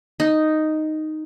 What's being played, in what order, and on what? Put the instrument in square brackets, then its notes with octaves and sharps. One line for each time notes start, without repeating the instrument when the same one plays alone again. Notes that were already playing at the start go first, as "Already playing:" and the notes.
[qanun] D#4